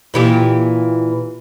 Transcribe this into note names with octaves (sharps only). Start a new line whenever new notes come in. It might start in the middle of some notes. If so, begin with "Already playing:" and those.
A#2 E3 G4